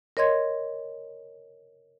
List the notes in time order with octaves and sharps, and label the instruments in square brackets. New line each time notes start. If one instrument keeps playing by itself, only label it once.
[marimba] A#4 C#5 D#5 C6 G#6